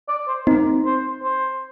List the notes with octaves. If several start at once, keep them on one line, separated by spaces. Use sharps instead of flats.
D5
C5
C4 D#4 A#4
C5
C5